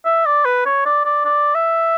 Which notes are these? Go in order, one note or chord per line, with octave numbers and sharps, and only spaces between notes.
E5
D5
B4
C#5
D5
D5
D5
E5